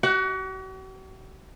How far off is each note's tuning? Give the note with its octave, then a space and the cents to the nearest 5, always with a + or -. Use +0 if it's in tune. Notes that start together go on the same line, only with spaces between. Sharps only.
F#4 +45 F#5 +15